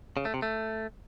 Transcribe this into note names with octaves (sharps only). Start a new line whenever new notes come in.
C#3
A3
C3
A3